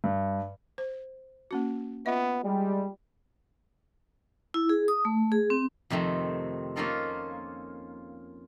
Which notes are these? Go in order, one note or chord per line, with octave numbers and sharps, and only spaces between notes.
G2
C5
A#3 C#4 F#4
B3 F4 D#5 E5
G3 G#3
E4
G#4
D#6
A3
G#4
C4
F2 C3 D#3 A3
A#3 C#4 D#4 F4 A4 A#4